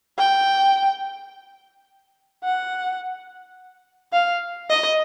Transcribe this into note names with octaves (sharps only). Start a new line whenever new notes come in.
G5
F#5
F5
D#5